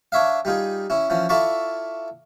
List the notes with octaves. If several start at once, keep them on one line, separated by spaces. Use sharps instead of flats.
D4 C#5 E5 F5
G3 D#4 F4 G#4
C#4 E4
E3 F3 C#4
E4 F4 A4 D5 B5 C#6